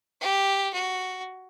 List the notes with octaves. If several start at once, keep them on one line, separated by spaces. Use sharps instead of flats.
G4
F#4